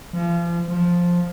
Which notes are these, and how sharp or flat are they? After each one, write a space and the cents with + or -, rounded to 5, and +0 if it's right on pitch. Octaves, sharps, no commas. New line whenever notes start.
F3 -35
F3 +5